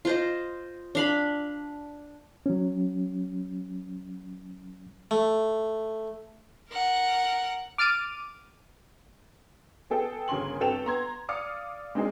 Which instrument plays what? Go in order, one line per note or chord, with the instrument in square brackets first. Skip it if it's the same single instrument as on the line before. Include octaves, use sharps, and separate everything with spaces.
[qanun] F4 C5 D#5
D4 F5 B5
[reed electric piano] F#3 C#4
[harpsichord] A3
[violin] A#4 F#5
[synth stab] D6 F6 A6 D7 D#7
[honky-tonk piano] B3 G#4 A4 G5
G1 C#3 A#4 G#5 C6 F#7
G2 C4 A4 G5 E7 F7
B3 A#5 C6 G#6
D5 F5 D6 D#6 F6 C#7
G#3 C4 D4 D#4 G#4 A#4